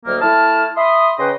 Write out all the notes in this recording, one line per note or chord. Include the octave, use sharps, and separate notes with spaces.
D2 F#3 A#3 D#5 F6
A3 E4 A5 F6
E5 B5 C6 D#6
C#3 B4 D#5 G5 C6